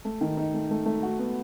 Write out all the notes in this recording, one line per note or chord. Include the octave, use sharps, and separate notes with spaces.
A3
D#3
D#4
A3
A3
A3
F#4
B3